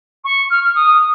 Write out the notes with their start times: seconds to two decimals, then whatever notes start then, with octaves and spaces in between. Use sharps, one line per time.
0.24 C#6
0.50 F6
0.63 F6
0.75 D#6